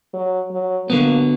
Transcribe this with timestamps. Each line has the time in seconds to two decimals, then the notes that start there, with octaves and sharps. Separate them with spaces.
0.13 F#3
0.51 F#3
0.90 D3 F#3 A#3 B3